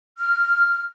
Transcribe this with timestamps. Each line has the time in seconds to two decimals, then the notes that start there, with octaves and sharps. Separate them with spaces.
0.18 F6